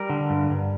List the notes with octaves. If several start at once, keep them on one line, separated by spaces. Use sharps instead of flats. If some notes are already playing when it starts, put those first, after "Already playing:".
Already playing: G3 A#4
D3
G2
G2